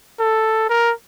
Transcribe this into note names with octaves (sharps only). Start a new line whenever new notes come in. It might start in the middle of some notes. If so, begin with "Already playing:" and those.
A4
A#4